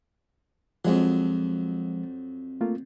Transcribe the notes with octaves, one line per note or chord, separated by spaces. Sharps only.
F2 F3 F#3 G#3
A3 A#3 F4